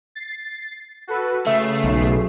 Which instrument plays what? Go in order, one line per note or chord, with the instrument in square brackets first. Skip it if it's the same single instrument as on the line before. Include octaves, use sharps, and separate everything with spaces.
[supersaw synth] A6 C7
F#4 A4 B4
[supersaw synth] C#3 C7 [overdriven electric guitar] A3 [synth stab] E5
[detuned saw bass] B1